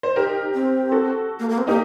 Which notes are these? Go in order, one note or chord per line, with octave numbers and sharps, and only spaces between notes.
C5
D#4 G4 A#4
C4
F#4 A4
A#3
A#3
C4
A#3 D#4 G4